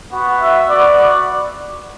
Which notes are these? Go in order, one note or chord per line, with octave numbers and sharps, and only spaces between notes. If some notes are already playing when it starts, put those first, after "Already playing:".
B3 F#4
E5
B3 F#4 D5